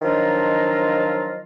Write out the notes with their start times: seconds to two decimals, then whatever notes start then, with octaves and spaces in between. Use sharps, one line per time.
0.02 D#3 F3 F#3 D4 F4 D#5